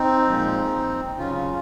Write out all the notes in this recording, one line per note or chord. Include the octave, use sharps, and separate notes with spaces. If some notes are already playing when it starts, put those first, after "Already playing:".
Already playing: C4 D#4
A#2 F3 G#3
C#3 F#3 C#4 F4